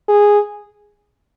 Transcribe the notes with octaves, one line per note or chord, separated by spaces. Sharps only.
G#4